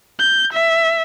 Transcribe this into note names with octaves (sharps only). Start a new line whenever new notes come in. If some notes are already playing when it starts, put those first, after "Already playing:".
G6
E5